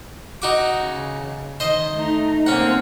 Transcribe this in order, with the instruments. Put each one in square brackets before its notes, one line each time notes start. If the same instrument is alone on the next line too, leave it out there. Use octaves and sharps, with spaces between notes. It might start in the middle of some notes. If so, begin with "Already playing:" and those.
[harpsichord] D#4 F#4 D6
[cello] C#3
[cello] D#3 [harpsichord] C5 D#5
[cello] A3 D#4
[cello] A#3 C4 [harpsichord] C#4 F#5